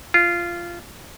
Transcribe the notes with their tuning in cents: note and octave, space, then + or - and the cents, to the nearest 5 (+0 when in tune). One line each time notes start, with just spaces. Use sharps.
F4 -15